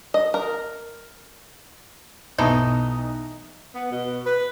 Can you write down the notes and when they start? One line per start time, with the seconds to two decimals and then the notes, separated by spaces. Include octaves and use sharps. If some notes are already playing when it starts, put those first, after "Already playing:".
0.14 D#5
0.34 A#4
2.38 B1 B2 E3 A3 D#4 D#6
3.75 B3
3.91 B2
4.25 B4